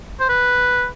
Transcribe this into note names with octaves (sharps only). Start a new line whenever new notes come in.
C5
B4